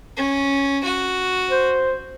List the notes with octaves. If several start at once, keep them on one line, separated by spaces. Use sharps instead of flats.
C#4
F#4
C5